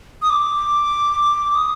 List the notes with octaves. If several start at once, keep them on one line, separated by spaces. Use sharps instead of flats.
D#6
D6
D#6